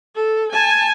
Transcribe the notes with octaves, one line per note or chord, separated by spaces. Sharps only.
A4
G#5 A5